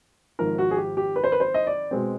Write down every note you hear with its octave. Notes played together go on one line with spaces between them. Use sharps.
G#1 G#2 F3 A#4
F#4
G#4
G4
G4
B4
C5
B4
C5
D#5
D5
B2 G#3 C4